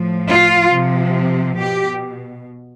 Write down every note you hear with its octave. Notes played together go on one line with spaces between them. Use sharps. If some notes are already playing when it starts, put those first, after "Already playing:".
Already playing: A2 F3
F4
C3 F3
B2 G4